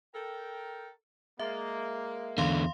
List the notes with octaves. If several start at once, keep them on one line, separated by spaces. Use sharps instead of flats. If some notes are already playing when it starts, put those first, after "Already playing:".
A4 A#4 G5
G#3 A#3 E5
E2 D3 F5 C6